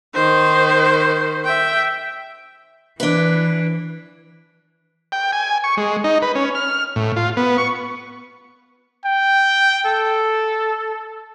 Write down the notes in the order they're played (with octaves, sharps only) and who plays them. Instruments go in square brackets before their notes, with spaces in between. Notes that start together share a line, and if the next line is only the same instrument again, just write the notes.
[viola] D#3 C5
E5 G5
[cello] E3 [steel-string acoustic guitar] D4 B4
[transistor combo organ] G5
G#5
C#6
G#3
D#4
B4
C#4
F6
A2
F4
B3
C#6
[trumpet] G5
A4